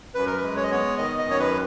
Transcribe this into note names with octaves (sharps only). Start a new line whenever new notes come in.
F#2 B4
A#4
B4
G#3
C#5
D#5
B3 C#5
D#3 D#5
D#5
F#2
C#5
B4